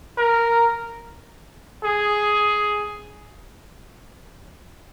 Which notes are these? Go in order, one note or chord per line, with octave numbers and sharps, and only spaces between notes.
A#4
G#4